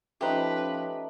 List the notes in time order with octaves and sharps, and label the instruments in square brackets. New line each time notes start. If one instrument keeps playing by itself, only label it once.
[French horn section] F3 C#4 [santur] A3 D#4 [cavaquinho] G4 C5 [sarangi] B4